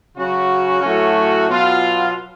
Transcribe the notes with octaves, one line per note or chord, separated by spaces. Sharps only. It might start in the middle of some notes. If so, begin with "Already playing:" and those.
C#3 F#3 C#4 F#4
A2 F#3 A3 C#4 F#4
B2 F#3 B3 F4